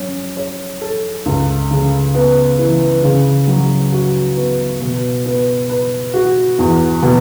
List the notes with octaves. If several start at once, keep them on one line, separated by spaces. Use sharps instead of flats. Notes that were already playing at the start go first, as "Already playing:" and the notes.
Already playing: F#3 C#4
C#5
A4
C#2
C#3
B3
E3
C#3
F#3
F#4
B3
B2
B3
B4
F#4
E2
B2